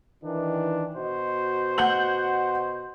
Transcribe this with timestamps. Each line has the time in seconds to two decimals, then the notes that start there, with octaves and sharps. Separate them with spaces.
0.24 D#3 E3 D4
0.96 B2 F#4 C5 D#5
1.78 F#5 G6 F#7